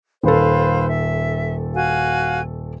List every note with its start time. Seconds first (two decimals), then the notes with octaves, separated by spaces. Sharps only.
0.24 D#1 A4 B4 C5 F5
0.89 E5
1.75 F#4 F5 G#5